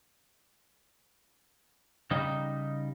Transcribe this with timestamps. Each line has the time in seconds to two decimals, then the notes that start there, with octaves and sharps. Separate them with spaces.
2.11 C#3 G3 D#4